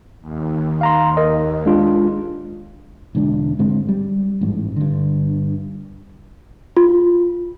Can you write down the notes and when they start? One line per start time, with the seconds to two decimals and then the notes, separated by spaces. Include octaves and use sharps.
0.21 D#2
0.81 F5 A#5 C6
1.17 A#4 D#5
1.66 G#3 D4 F4
3.15 E1 D3 G#3 D4
3.59 G#2 D3 G#3 C4
3.89 G3
4.41 A1 G#2
4.76 G2 D3
6.77 F4